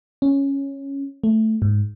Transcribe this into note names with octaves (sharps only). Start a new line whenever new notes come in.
C#4
A3
G#2